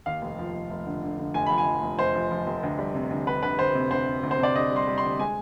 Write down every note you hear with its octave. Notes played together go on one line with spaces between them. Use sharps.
D#2 F5
F1
F3
F1
F1
D3
D3
D3
F1 G#5
F3 B5
G#5
F3
F1
F1 C5
F3
F3
F1
D2
G3
C3
D2
D2 B4
D2 B4
D2 C5
C3
D2 C5
D2
D2
C5
C3 D5
D2 D#5
G3 C6
G3
C6
D2
G#3 G#5